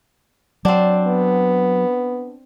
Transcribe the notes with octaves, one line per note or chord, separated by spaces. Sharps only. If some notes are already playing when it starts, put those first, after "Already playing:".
F#3 C4 D4
B3